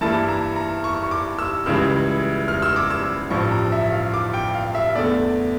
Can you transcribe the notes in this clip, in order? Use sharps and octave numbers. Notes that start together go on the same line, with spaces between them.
G2 E3 A#3 E4 A5
A#5
A#5
C#6
C#6
D6
E6
C#2 C#3 E3 G3 E6
F6
E6
D6
E6
A1 G2 F3 C#6
A#5
E5
F5
D6
G5
F5
E5
E2 D3 A3 D5